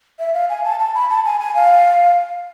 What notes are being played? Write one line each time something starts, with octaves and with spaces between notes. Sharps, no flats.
E5
F5
G#5
A5
A5
B5
A5
G#5
G#5
F5